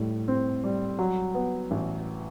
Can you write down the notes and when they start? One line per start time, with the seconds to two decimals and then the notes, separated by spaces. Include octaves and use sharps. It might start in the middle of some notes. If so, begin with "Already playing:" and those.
Already playing: A2 G3
0.28 C4
0.64 G3
0.99 F#3
1.35 B3
1.71 A1